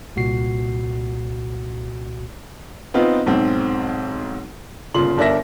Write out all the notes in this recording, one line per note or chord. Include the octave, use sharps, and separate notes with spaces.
C2 A#2 F#4 C7
B3 C4 D#4 F4
B1 G#2 C4
G1 A#2 C#3 C6 F#7
G1 D4 A#4 E5 A#6